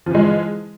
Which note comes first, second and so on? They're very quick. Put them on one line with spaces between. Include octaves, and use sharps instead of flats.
F3 E3 G#3